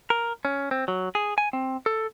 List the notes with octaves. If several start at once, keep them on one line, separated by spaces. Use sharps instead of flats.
A#4
C#4
C4
F#3
G#4
G#5
C4
A4